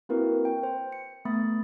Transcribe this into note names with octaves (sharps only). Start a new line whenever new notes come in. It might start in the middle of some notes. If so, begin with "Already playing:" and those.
A#3 C4 E4 F#4 A#4 B4
G5
C5
C#7
A3 B3 B5 D#6 A6